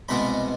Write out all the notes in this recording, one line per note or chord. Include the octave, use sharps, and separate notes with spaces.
C2 B2 G#3 B3 D4 B5